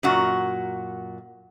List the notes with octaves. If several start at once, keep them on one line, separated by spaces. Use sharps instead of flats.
F#2 A#2 F#4